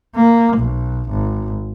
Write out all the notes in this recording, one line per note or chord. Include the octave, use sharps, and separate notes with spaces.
A#3
B1
G#1